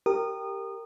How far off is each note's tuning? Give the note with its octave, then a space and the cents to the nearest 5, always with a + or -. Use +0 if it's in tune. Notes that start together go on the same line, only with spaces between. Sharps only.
G4 +0 A#4 -15 D#6 -25